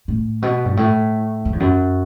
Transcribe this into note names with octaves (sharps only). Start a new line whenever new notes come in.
A2
B2
G2
A2
F#2
E2
F#2